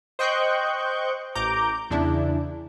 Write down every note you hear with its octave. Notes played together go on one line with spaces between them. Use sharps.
C5 D#5 G5 C#6 F#6 G6
A1 A#5 D6 G6 D7
E2 C#3 D4 E4